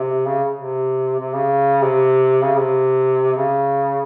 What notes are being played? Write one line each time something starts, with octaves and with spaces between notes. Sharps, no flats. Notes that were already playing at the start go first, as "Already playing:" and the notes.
Already playing: C3
C#3
C3
C3
C#3
C3
C#3
C3
C#3